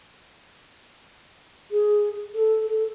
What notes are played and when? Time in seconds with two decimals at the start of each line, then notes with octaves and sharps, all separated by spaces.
1.71 G#4
2.34 A4
2.66 A4